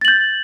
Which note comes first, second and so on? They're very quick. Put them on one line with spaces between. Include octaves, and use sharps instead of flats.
A6 F#7 G6